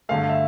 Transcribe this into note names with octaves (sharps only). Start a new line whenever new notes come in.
G2 D3 A3 F5
E5